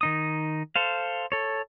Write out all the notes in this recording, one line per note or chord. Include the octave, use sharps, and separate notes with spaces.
D#3 D#4 D#6
A4 C5 F5
A4 C#5